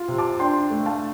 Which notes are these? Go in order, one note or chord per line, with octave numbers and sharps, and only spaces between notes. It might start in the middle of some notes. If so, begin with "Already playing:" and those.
Already playing: F4
C3
A5 D6
D4 G5 C6
A3
F5 A5